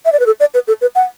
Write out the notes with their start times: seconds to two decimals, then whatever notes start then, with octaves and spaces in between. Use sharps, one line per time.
0.05 E5
0.12 D5
0.20 B4
0.26 A4
0.40 D5
0.54 B4
0.68 A4
0.81 B4
0.95 F#5